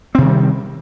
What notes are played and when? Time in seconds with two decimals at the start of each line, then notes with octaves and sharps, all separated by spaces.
0.15 C4
0.18 C3
0.22 D#3
0.25 G3